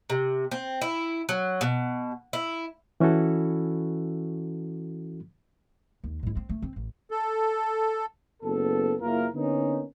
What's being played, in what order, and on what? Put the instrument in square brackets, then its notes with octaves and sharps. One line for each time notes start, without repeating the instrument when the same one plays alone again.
[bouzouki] C3
C4
E4
F#3
B2
E4
[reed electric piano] E3 C#4 E4 F#4 A4
[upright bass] D#2
G#2 E4
C4
A3
C4
A1
[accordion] A4
[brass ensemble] F#1 B3 A4
F#1 F#2 A#3 E4 F4 A#4
D3 A#3 B3 C#4 D#4